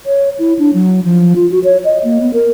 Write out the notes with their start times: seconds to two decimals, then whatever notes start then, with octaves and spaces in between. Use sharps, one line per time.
0.06 C#5
0.39 E4
0.59 D4
0.74 F#3
1.04 F3
1.36 F4
1.51 F#4
1.64 C#5
1.85 D#5
2.04 A#3
2.21 B3
2.34 A#4